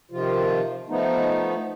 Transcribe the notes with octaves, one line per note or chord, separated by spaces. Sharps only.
C3 D#3 F3 F4
F3 A3 B3 D#4